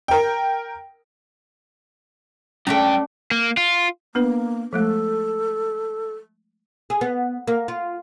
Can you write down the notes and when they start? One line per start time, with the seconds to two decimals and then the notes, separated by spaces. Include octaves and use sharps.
0.08 A#4 G5
2.67 G2 A3 C#4 D4 G5 A#5
3.31 A#3
3.57 F4
4.15 A#3 B3 D4 B4
4.73 F3 G#3 A3 A4
6.90 G#4
7.01 B3
7.48 A#3
7.68 F4